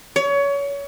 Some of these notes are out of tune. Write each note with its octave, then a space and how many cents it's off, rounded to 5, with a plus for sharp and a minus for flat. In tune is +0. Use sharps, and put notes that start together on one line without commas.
C#5 +25